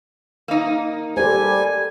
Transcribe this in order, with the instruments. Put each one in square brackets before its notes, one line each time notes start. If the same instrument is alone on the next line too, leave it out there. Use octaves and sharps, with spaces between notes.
[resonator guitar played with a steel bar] A#3 D#4
[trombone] G3 [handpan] A4 C5 [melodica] G#5